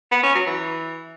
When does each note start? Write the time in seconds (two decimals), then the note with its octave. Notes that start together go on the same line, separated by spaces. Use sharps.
0.12 B3
0.23 C#4
0.35 F#3
0.47 E3